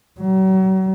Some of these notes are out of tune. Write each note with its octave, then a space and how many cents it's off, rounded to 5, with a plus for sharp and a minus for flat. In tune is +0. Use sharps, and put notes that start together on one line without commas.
F#3 +40